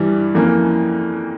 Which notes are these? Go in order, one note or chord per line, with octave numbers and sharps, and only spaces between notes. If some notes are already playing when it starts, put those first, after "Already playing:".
Already playing: G2 E3 G3
F2 E3 A#3 C#4